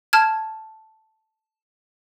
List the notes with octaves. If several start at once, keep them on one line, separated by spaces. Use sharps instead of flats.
A5 F6 G#6